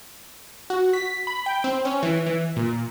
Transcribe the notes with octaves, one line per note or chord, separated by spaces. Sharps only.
F#4
B6
B5
G5
C4
C#4
E3
E3
A#2